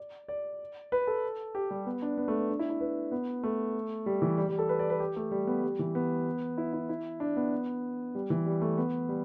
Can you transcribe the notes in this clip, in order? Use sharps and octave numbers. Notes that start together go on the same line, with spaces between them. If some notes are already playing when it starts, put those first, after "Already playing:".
Already playing: D5
D5
B4
A4
G4
G3
B3
D4
B3
A3
B3
D4
E4
E4
B4
B3
A3
G3
E3
G3
G3
A4
B4
D5
B4
G4
A3
G3
B3
G3
E3
B3
E4
E4
E4
D4
B3
G3
E3
G3
A3
B3
G3